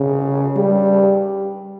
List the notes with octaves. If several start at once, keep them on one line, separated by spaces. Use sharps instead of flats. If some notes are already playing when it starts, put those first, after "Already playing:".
Already playing: C#3
G3